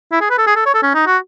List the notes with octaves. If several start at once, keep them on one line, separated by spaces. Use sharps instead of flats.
E4
G#4
B4
A4
G#4
A4
C#5
A4
C#4
D#4
F#4